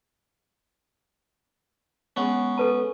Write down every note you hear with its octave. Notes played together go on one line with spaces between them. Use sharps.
G#3 B3 C#4
A4 B4 A5